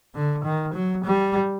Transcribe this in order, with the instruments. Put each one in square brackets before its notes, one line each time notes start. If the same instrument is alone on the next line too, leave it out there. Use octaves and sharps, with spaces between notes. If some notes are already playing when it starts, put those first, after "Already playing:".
[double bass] D3
D#3
F#3
G3